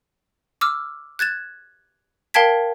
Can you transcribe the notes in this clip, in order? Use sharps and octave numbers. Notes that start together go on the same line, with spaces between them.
D6 E6 F6
F#6 G#6 A6 E7
A#4 F5 G5 A5 G#6 B6